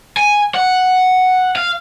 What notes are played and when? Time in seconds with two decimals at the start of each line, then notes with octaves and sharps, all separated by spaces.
0.17 G#5
0.55 F#5
1.56 F5